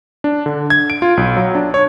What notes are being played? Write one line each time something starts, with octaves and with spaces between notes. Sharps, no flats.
D4
D3
G#6
D7
F4
B1
F#3
D4
C#5